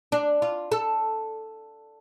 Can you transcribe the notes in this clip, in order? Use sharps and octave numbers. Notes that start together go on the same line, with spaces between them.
D4
F4
A4